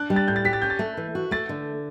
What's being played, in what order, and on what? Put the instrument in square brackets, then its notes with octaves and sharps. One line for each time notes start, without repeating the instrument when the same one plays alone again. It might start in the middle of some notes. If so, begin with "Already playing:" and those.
Already playing: [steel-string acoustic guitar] D4 [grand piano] F#6
[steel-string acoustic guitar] G3
[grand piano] A6
[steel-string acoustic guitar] A2 [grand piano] G6
[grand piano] A6
[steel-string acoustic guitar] G4 [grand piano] B6
[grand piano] A6
[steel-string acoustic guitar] C#4 [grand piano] G6
[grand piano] A6
[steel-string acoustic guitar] A3
E3
F#4
[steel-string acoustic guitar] A3 [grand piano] A6
[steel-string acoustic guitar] D3